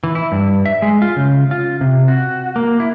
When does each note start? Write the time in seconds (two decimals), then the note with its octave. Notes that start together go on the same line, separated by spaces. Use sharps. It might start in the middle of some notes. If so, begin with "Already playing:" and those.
0.04 E3
0.15 E4
0.32 G2
0.65 E5
0.82 G#3
1.02 F4
1.16 C#3
1.51 F4
1.81 C3
2.08 F#4
2.56 A#3
2.80 E4